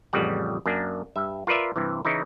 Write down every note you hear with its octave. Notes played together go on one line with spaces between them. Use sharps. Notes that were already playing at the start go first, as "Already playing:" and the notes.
A1 F2 C#3 G3 F#5
F#2 A#3 D4
G2 E5
F4 A#4 B4 D5 E5
G2 C3 E3
C#3 E3 D#4 E4